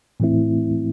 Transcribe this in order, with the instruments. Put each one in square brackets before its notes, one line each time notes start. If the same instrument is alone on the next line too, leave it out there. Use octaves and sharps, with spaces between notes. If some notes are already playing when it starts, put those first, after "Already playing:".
[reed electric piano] A2 E3 A3 C4 E4